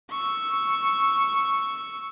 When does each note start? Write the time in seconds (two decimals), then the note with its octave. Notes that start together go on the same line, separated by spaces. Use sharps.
0.11 C#6 E6